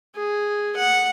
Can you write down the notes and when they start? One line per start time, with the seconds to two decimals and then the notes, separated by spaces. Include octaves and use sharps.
0.16 G#4
0.76 F#5